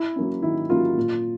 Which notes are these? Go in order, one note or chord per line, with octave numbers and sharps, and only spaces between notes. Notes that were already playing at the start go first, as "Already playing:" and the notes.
Already playing: E4
F#3 A#3 C#4
D#3 E4
F#3 A#3 C#4 F4
A#2